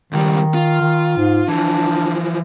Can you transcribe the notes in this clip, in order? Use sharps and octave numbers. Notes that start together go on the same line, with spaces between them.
C#2 D#3 G3
F4
D#3
G#2
E3 F3 D4